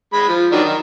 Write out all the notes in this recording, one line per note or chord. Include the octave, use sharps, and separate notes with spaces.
G#3 B5
F3
D#3 F#3 D4
D#3